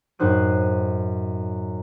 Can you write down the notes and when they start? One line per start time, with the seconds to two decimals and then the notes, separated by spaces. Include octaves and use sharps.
0.19 F#2 A2 D#4 C5 F#6 D#7